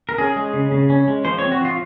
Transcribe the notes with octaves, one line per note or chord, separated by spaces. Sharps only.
A#4
C#4 G#4
G#3
C#3
C#3
C#4
G#3
F3 C5
C4 C#5
F#4
F3 F4